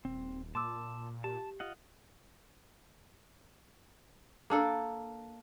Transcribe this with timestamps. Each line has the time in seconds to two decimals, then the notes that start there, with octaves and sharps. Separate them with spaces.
0.05 D#1 C4
0.55 A#2 A5 C6 D6 E6
1.24 G4 A5
1.60 F4 D#5 F#5
4.50 A#3 D4 A4